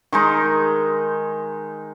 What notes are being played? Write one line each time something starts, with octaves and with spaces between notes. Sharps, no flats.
D#3 G#3 D#4